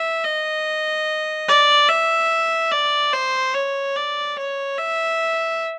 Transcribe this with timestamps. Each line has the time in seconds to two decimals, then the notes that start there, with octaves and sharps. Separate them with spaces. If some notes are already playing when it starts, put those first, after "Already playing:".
Already playing: E5
0.24 D#5
1.48 D5
1.89 E5
2.72 D5
3.13 C5
3.54 C#5
3.96 D5
4.37 C#5
4.77 E5